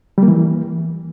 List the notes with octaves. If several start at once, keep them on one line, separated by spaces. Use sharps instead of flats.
G3
A#3
E3